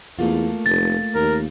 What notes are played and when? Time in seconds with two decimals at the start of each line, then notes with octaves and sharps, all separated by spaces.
0.19 E2 A3 A#3 F4
0.66 F1 A6
1.15 D#2 A#4